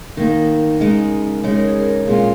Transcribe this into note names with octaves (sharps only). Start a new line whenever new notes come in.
D#3 A#3 D#4 A#4
C#3 G#3 D#4
C#3 G#3 D#4 C#5
A#4
G#4
A#4
A#2 G#3 C#4 F4 G#4